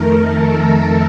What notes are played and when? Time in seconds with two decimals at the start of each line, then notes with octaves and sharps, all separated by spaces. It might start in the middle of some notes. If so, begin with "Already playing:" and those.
Already playing: F2 D#3 A3 A#4
0.14 A4